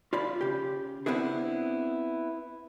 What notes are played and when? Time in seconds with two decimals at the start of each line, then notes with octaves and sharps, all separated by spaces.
0.13 F4 D5 B5
0.41 C#3 G4
1.06 B3 C4 D4 E4 G#4